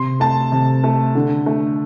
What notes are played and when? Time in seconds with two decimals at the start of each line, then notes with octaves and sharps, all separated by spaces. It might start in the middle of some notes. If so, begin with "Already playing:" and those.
Already playing: C3 C6
0.20 A3 A5
0.52 C3
0.84 A3
1.15 D3
1.46 A3